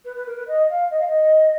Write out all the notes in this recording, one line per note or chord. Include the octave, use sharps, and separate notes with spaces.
B4
B4
A#4
B4
D#5
F5
D#5
F5
D#5